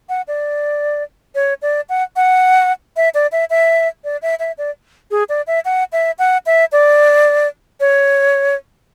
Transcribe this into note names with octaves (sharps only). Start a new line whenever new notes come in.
F#5
D5
C#5
D5
F#5
F#5
E5
D5
E5
E5
D5
E5
E5
D5
G#4
D5
E5
F#5
E5
F#5
E5
D5
C#5